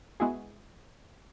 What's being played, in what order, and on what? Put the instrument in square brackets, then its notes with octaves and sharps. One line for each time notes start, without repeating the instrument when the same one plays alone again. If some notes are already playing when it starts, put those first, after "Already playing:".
[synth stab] G#3 B3 E4 F#4 G#4